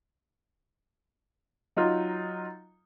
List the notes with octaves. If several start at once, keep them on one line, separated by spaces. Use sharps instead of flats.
F#3 D#4 F4